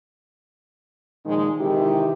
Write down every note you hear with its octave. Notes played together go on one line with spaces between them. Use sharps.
A#2 D#3 F3 G#3 D#4
C3 D#3 E3 G#3 E4 G4